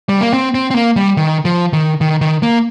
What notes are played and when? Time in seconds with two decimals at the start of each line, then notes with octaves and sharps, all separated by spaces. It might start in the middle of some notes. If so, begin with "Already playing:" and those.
0.09 G3
0.21 A#3
0.34 C4
0.54 C4
0.71 C4
0.75 A#3
0.96 G3
1.17 D#3
1.45 F3
1.73 D#3
2.01 D#3
2.21 D#3
2.43 A#3